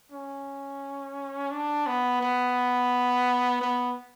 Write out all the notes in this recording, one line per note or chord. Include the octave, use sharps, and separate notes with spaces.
C#4
D4
B3
B3
B3